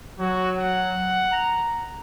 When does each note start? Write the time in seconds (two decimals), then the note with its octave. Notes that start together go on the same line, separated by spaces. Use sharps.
0.20 F#3 F#4
0.58 F#5
1.32 A#5